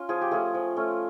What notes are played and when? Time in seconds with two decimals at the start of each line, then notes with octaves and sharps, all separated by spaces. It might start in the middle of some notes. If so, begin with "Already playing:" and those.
Already playing: C#4 F4
0.09 F3 G#4
0.21 G4
0.31 A3 C#4 F4 G#4
0.54 F3
0.77 A3 C#4 F4